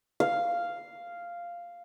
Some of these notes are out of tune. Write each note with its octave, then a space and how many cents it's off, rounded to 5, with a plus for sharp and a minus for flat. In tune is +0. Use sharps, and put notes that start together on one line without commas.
F5 -5